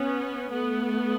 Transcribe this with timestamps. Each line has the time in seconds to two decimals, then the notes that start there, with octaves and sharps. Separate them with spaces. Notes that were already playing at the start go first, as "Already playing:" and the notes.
Already playing: B3 C#4
0.50 A3 B3